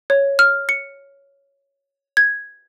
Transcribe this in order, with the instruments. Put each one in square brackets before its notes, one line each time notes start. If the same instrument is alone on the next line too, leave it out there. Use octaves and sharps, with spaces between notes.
[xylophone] C#5
F6
C#7
G#6